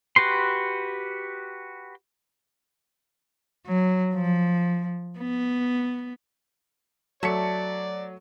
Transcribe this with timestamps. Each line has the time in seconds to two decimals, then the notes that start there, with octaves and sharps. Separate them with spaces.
0.16 F#4 G4 B4 C6
3.65 F#3
4.14 F3
5.19 B3
7.23 F#3 A3 D5 B6 C#7